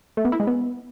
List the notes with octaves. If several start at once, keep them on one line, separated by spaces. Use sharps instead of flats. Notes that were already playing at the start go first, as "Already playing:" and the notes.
A3
B3
E4
G#3
B3